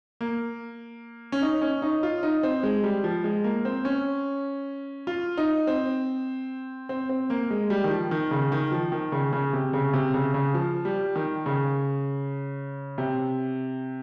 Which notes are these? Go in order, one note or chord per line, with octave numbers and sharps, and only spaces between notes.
A#3
C#4
D#4
C#4
D#4
F4
D#4
C4
G#3
G3
F3
G#3
A#3
C4
C#4
F4
D#4
C4
C4
C4
A#3
G#3
G3
D#3
F3
D#3
C#3
D#3
F3
D#3
C#3
C#3
C3
C#3
C3
C#3
C#3
F3
G3
D#3
C#3
C3